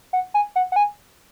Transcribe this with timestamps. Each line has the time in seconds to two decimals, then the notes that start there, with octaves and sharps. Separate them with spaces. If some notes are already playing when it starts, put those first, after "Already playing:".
0.13 F#5
0.34 G#5
0.56 F#5
0.72 F#5
0.76 G#5